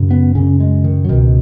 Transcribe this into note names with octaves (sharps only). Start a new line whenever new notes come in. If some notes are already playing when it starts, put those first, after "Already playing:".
Already playing: F#2 C#3
B3
F#2 C#3 C#4
G#3
D#3
F#3
C#2 B2 D#3